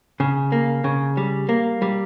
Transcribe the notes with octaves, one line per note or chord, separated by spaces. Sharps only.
C#3
A#3
C#3
G3
A#3
G3